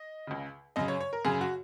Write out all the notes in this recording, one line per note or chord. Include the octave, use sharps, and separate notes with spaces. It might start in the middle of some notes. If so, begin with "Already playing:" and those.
Already playing: D#5
C#2 C#3
F#2 C#3 D#5
C#5
C#5
A#4
F#2 C#3 G#4
F#4